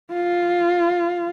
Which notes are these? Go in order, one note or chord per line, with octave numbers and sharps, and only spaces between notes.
F4